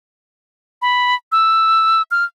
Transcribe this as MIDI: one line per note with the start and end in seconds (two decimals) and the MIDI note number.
0.82 1.15 83
1.32 2.02 88
2.11 2.24 89